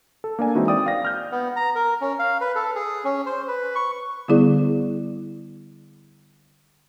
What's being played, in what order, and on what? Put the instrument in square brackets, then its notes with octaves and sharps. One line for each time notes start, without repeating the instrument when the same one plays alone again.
[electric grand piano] A4
A#3 D4 D5 G#5
E3 G#3 C4 D#4 E4 F#4
D5 G5 D#6
F5 A#6
F6 G6
[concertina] B3
A#5
A#4
C#4
F5
B4
A4
G#4
C#4
C5
B4
C#6
[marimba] D3 G3 B3 E4 G#4 D5